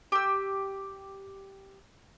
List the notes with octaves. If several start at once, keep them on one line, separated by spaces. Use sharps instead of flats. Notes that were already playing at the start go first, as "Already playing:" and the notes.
G4 E6